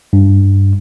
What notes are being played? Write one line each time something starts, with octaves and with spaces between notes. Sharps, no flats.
G2